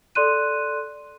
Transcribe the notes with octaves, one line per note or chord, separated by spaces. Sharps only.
A4 D5 C6 F#6 D#7